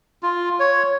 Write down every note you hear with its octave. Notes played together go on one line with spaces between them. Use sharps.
F4
C#5